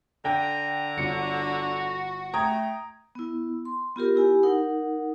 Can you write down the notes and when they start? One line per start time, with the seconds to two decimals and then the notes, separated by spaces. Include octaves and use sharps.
0.25 D3 G5 A#5
0.97 G1 F#4 C#7
2.34 A3 G5 A#5 D#6 G#6
3.15 B3 E4
3.65 C6
3.96 B3 F4 G4 A#4
4.16 E4 G4 G#5 B5
4.43 D#4 A#4 F#5